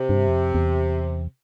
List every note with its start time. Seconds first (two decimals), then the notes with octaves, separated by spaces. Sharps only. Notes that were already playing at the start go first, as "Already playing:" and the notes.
Already playing: C3
0.09 G2
0.28 F2
0.55 E2